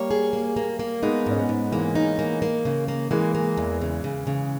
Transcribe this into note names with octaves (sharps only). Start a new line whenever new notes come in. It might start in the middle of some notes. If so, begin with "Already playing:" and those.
Already playing: G3 A#3 C#5
G#4
A#3
A#3
A#3
G#3 B3 D#4
G#2 C#4
G#3 B3
G#2
E3 G#3 A#3
D#4
A#3
A#3
C#3
A#3
E3 G#3 A#3
A#3
E2
C#3
C#3
C#3